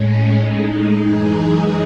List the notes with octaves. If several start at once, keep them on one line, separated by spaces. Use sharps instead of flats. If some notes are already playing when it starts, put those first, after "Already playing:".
Already playing: A2 G#3 C#4
A2 G#3 D#4
F#2 E3 G#3 D#4 G#4